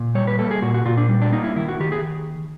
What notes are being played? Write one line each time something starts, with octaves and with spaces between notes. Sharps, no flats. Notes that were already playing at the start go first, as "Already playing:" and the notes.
Already playing: A#2
G3 C#5
B4
A#3 A4
G#4
A#2 F#4
F#4
A#2 F4
D4
G3
D4
A#3 D#4
E4
D#3 E4
F#4
D#3 G4
G#4